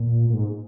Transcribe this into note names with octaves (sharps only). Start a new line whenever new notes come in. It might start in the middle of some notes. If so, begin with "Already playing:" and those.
Already playing: A#2
A#2
G#2